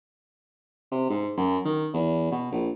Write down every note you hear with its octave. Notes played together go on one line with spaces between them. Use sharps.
C3
G#2
F#2
D#3
E2
B2
A#1